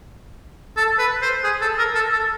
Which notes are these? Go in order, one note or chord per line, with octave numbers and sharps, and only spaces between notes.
A4
B4
C5
G#4
A4
A#4
A4
A4